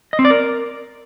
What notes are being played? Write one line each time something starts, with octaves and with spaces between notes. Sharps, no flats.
D#5
C4
D5
A#4